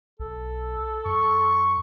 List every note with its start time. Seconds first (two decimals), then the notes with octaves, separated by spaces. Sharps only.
0.19 B1 A4
1.05 F#2 C#6